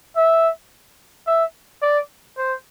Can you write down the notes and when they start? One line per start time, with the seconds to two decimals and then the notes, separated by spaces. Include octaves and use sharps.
0.16 E5
1.27 E5
1.82 D5
2.38 C5